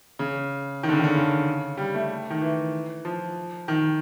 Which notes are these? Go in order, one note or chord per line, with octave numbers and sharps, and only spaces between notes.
C#3
D#3
D3
C#3
D#3
D3
C#3
G3
A3
D#3
E3
F3
D#3